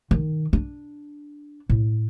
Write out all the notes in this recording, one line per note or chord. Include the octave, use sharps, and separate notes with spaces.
D#3
D4
A2